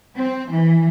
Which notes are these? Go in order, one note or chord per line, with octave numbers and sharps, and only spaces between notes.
C4
E3